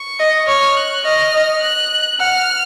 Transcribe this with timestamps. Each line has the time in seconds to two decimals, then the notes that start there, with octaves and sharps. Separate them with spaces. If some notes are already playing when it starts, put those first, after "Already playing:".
Already playing: C#6
0.19 D#5
0.47 C#5 F6
0.76 F#6
1.04 D#5 F6
1.62 F#6
2.20 F#5 F6